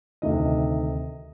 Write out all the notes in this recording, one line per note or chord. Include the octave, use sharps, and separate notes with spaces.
D2 C3 D#3 D#5